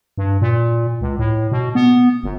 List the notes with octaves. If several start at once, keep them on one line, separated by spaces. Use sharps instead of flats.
G2
A#2
C#2
A2
B2
B3
G1